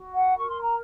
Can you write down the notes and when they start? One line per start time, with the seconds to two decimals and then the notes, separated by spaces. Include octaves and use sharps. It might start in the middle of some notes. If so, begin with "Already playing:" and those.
Already playing: F#4
0.14 F#5
0.35 A#4 C#6
0.48 C6
0.62 A#5